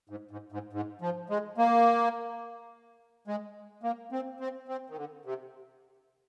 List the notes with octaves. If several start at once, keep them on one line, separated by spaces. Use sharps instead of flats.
G#2
G#2
G#2
G#2
F3
G#3
A#3
G#3
A#3
C4
C4
C4
D#3
D3
C3